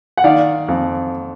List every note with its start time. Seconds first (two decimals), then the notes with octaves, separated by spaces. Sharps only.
0.17 F#5
0.24 D#3 D5 F5
0.68 F2